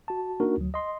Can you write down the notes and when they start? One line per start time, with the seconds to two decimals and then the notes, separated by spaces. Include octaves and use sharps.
0.08 F#4 A5
0.40 A#3 D4 D#4 F#4 A#4
0.58 D2 F#3
0.74 D#5 C6